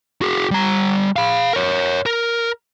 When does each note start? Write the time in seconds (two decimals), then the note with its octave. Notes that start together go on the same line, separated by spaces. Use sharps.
0.21 F#4 G#4
0.51 G3 A#5
1.16 F5 B5
1.53 A#4 C#5
2.06 A#4